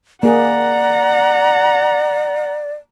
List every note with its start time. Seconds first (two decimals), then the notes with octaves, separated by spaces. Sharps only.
0.23 A#3 G#4 D5 F#5 A#5